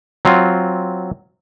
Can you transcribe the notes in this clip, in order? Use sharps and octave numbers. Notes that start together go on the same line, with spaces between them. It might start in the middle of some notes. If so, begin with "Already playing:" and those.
F#3 C4 F4